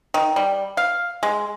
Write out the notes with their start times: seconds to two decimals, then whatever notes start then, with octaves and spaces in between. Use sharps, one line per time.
0.14 D#3
0.36 G3
0.77 F5
1.23 G#3